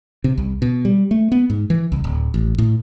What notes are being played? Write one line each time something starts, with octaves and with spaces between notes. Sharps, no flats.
C3
C2
B2
G3
A3
B3
G#2
E3
C2
D1
A1
A2